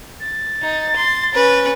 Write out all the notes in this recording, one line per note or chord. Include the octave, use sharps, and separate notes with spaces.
A6
D#4
C6
C#4 B4